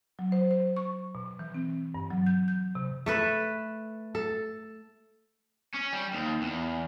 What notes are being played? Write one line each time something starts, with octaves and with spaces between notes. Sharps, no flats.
F#3
C5
C5
C#6
B2
E3
C4
G2
F#3
G6
G6
C3
A3 A4 B4
A4
C#4
G3
D#2
E2